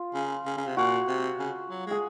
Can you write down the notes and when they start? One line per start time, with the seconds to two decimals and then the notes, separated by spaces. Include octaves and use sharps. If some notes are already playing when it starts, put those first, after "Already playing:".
Already playing: F4
0.14 C#3
0.46 C#3
0.57 C#3
0.67 C3
0.77 A#2 F#4
1.08 C3
1.39 C#3
1.70 F#3
1.87 G#3 G#4